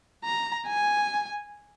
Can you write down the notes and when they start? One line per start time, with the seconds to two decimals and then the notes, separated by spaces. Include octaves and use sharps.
0.24 A#5
0.67 G#5